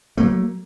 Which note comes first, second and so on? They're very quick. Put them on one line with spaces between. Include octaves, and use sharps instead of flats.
A3 A#3 F#3